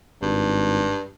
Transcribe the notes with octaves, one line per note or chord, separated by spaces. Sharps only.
G#1 G2